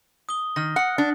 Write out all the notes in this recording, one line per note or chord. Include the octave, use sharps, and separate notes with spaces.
D#6 G7
D#3 F6 A#6
F#5 F#6 C#7
D4